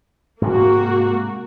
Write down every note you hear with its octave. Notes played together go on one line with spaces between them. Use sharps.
G#2 C3 G#3 A#3 F#4